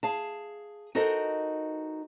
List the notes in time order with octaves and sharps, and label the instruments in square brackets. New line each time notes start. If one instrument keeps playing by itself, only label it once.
[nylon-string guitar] G#4 F5 A5
D#4 F#4 A4 A#4 C5 D#5